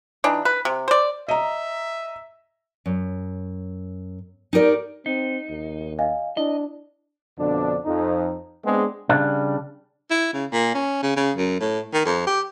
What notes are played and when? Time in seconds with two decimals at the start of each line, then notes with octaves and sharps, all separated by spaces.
0.24 E3 D4 D#4
0.45 B4
0.65 C3
0.88 C5 D5
1.28 D#5 E5 A#5
2.86 F#2
4.53 D#4 G4 A#4 D5
5.06 C4 D#4
5.50 D#2
5.99 D#5 F5 G#5
6.37 D4 E4 D#5
7.38 F2 B2 D3 D4
7.85 F2 D#4
8.64 G#3 B3 C4 D4 G#4
9.09 C#3 G3 D4
10.11 E4
10.34 C#3
10.52 A#2
10.74 C#4
11.03 C#3
11.17 C#3
11.37 F#2
11.60 A2
11.93 D#3
12.06 F2
12.27 G4